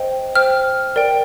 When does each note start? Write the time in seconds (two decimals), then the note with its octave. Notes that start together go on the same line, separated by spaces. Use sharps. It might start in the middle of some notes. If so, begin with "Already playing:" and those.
Already playing: C5 D#5 G5
0.35 C5 G5 F6
0.96 A#4 D5 G5